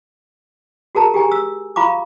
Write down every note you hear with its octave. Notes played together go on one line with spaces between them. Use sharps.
F#4 G#4 A#4 A5 A#5
G4 G#4 G#5 A#5
E6
F4 F5 A#5 B5 C#6 D6